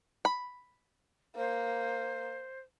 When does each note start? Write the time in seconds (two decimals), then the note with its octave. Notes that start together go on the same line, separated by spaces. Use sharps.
0.25 B5
1.36 A#3 C5